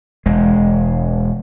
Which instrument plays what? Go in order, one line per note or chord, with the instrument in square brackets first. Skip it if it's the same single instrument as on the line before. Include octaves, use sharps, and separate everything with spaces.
[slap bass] E1 G#3